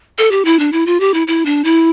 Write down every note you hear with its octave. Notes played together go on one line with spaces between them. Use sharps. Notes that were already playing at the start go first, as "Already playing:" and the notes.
A4
G4
E4
D4
E4
F4
G4
E4
E4
D4
E4